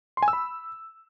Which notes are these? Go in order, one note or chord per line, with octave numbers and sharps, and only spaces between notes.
C6
G#5
E6
B5